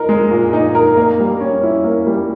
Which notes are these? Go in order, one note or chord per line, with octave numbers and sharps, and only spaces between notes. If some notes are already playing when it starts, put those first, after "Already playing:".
Already playing: D#4 A#4
G#3
A#2
D#4
A#4
A#3
G3
C#4
E4
A#3
G3